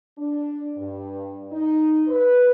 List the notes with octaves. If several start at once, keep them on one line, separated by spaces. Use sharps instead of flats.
D4
G2
D#4
B4